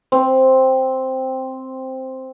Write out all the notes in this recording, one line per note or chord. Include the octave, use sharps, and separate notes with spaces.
C4